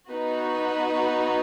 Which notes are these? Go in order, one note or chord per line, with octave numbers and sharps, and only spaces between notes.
B3 D#4 F#4 B4